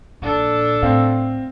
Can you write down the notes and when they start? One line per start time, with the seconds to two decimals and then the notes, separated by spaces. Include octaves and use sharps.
0.22 A#1 A#2 D4 A4
0.83 A2 C4 F5